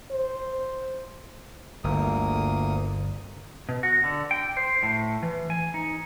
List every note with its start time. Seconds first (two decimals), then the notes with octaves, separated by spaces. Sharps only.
0.11 C5
1.84 G1 D2 A#3 D#6
3.69 B2
3.83 F#4
4.04 D3
4.31 G5
4.57 C5
4.83 A2
5.23 E3
5.50 G#5
5.74 D#4